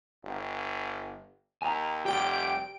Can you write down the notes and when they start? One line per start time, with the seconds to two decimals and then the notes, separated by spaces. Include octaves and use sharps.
0.23 G1
1.62 D#2 G#5 A#5
2.05 F1 G4 D5 G5 D7